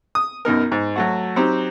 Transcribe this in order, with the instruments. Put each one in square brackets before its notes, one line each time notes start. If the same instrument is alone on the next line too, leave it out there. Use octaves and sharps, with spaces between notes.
[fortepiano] D#6
F#2 B2 D#4 A#4
G#2
F#3 A3 F#4
F#3 C4 D#4 G4